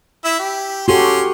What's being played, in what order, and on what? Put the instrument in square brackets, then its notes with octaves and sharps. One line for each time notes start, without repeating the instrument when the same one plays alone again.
[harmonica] E4 E5
G4
[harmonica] C#4 C6 [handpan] F#4 G4 A4